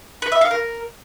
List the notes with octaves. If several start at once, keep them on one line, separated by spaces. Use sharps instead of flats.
B4
E5
F5
A#4